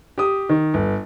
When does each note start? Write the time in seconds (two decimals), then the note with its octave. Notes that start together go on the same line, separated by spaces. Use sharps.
0.18 G4 D#6
0.49 D#3
0.74 G1